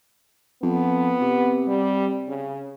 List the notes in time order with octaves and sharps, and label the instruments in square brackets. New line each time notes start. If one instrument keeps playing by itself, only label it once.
[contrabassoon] F2 [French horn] B3
[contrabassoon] C3
[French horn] G3
C#3